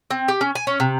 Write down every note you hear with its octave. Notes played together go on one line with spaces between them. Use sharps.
C4
G4
C#4
G#5
C#4
C3